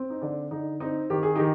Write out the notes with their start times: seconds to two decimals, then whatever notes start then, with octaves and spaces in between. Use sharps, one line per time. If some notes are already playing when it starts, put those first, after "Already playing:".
Already playing: C4
0.10 D#4
0.22 D3 D4
0.51 D3 D#4
0.80 C4 D#4
1.10 D#3 G4
1.23 G#4
1.35 D#3 D#4 G4